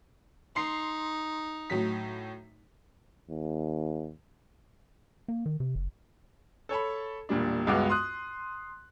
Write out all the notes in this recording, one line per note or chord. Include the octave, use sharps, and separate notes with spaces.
D#4 C6 C7
A2 F#3 B6
D#2
A#3
D#3
C3
F#1
A4 C#5 A5 B5
E1 A#2 G3 D4
C#2 G2 G#3 B3 F#4 D6
C6 D#6 F#6